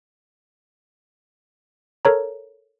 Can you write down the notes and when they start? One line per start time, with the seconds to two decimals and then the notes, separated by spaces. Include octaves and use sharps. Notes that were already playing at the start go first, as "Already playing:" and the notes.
2.05 A4 A#4 C#5 A#5